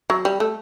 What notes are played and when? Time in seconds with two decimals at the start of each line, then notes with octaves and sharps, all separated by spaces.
0.10 F#3
0.25 G3
0.40 A3